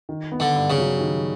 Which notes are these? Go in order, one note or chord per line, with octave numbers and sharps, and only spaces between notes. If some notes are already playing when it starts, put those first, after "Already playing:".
D#3
B3
D3
G2
C#3
F#3
D#3